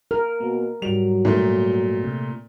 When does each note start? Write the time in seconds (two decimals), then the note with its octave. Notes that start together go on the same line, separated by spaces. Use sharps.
0.11 A#4 F6
0.40 B2 A#3
0.82 G#2 F#3 G3 F7
1.25 A#2 A3
2.04 C3